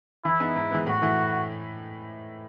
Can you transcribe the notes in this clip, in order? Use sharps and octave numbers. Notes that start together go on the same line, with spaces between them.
E3 E4
B3 D#4 G#4
G#2
E3 G#3 B3
A2 F#4
E3 A3 E4